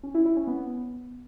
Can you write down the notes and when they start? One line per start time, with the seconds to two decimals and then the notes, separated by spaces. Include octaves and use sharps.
0.03 C#4
0.14 E4
0.25 E4
0.36 C#4
0.47 B3